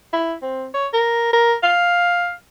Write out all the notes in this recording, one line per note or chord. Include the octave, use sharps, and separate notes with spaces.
E4
C4
C#5
A#4
A#4
F5